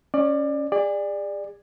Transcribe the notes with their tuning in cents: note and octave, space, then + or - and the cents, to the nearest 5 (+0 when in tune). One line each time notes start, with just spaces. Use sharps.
C#4 +0 D5 +25
G#4 -35 D5 +15